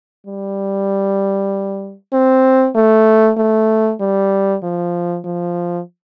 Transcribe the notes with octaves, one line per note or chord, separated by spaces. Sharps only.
G3
C4
A3
A3
G3
F3
F3